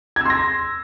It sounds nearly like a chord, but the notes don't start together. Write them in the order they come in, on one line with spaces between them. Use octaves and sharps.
G#6 E6 C6 A#6